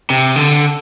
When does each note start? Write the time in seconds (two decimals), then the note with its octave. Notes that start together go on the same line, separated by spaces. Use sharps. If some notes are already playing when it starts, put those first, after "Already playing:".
0.10 C3
0.36 D3